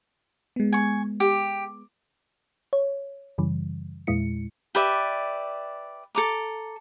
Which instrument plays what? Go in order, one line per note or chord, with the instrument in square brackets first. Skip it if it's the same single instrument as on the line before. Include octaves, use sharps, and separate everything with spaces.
[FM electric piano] G#3 B3
[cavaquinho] G#5 C#6
G4
[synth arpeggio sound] C#5
F#2 C#3 E3 G3
E2 A#2 G#3 E4 C#7
[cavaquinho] G4 B4 D5 E5
A4 A#5 D6